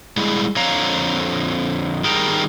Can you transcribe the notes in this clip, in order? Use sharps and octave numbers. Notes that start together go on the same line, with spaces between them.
G3 G#3 E4 G#4
F2 D3 C#5 F5 A#5
D#3 G3 G#4 A#4 G5 A#5